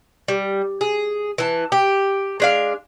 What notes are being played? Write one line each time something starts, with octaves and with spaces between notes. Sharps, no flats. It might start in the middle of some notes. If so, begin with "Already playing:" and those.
G3
G#4
E3 A5
G4
G#3 D4 F5